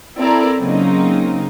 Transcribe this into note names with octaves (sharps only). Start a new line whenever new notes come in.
C4 E4 A4 A#4 D5
C#3 F#3 A#3 C4 D#4